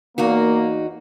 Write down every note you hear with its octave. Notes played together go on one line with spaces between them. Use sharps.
E2 A#3 D#4 F#4